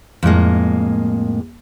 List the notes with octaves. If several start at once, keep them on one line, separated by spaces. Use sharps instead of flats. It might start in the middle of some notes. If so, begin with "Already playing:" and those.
F2 A2 G#3 A#3